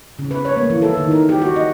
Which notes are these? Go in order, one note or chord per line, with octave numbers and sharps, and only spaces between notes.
C#3
B4
C#5
A#3
E3
A4
D#3
A#4
G4
F#4
D#5